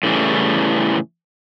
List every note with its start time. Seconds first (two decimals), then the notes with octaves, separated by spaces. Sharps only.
0.03 A2 C#3 E3 G3